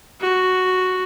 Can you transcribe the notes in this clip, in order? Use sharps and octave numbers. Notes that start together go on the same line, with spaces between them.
F#4